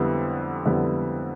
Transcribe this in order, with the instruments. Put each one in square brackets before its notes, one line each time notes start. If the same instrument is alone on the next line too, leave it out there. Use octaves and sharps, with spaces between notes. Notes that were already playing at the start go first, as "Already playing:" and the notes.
Already playing: [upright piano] F2 D3 G3 B3 E4
F2 D3 G3 B3 E4